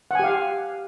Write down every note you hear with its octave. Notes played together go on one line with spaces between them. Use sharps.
G4 F5 F#5 G#5